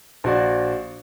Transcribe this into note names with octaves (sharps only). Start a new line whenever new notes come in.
A#1 F#4 D5